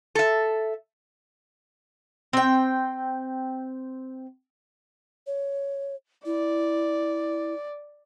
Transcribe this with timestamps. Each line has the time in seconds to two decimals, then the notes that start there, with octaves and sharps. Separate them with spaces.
0.15 A4 E5
2.33 C4 G5
5.27 C#5
6.26 E4 D5